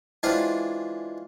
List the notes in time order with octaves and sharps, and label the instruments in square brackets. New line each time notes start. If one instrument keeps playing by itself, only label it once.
[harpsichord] E3 G#3 D4 F4 G4 C5